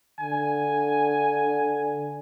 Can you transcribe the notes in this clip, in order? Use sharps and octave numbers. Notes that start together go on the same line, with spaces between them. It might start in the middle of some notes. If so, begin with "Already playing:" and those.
D3 G#5